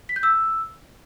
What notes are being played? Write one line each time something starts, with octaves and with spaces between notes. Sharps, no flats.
B6
G6
E6